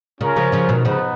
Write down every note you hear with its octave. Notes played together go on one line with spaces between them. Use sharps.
C#3 C#4 F4 A#4
C#3 F3
C#3 F3
B2 D#3
C#3 F3 B3 D#4